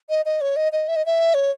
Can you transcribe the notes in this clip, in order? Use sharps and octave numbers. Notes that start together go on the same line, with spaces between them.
D#5
D#5
C#5
D#5
D#5
E5
D#5
E5
C#5